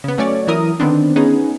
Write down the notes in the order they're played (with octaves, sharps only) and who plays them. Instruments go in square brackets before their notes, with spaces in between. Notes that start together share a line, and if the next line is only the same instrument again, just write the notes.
[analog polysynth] C#3 B3
F#3 A3 C#4 C#5 D5
E3 F#3 E4 A#4 D#6
D3 D#3 B3 C4 D4
B3 C#4 D#4 G#4